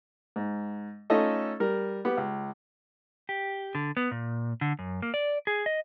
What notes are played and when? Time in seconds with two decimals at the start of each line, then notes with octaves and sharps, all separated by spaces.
0.36 G#2
1.10 A3 C#4 D#4 F4 A4 D#5
1.60 G3 A#4
2.05 B3 G4
2.17 C#2
3.29 G4
3.75 D3
3.97 B3
4.11 A#2
4.61 D3
4.79 F#2
5.02 A#3
5.14 D5
5.47 G#4
5.66 D#5